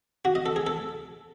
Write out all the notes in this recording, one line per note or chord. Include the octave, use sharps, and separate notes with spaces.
F#4
D#5
A4
G#4
A4